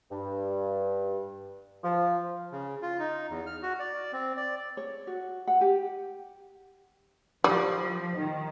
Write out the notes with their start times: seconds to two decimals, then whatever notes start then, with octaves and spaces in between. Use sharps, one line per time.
0.11 G2
1.83 F3
2.52 C#3
2.82 F4
2.99 D#4
3.31 E2
3.46 F6
3.62 F#4
3.79 D5
4.13 C4
4.37 D5
4.77 C#5
5.07 F#4
5.47 F#5
5.61 G4
7.44 F3 G3
8.18 D#3